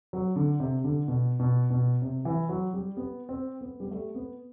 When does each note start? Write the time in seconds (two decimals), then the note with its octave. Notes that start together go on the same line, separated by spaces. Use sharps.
0.13 F#3
0.36 D3
0.60 C3
0.84 D3
1.08 B2
1.40 B2
1.70 B2
2.02 C3
2.25 E3
2.49 F#3
2.73 G3
2.97 B3
3.29 C4
3.61 B3
3.80 G3
3.91 A3
4.15 B3